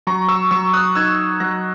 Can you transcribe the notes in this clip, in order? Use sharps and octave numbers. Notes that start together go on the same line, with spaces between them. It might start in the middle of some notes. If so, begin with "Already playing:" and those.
F#3 A#5 C#6
C#6 E6
F#3 C#6 E6
D#6 F#6
D#4 E6 G#6
F#3 F#6 A#6